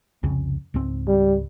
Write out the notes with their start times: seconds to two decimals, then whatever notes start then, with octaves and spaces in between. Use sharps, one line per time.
0.23 C2 F2 C#3
0.74 C#2 G#2 C4
1.08 G3